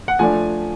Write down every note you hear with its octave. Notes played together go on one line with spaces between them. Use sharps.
F#5
F3 A3 D4 G#5